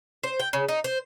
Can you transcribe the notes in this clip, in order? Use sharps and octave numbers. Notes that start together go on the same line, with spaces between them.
C5
G5
C#3
D#4
C5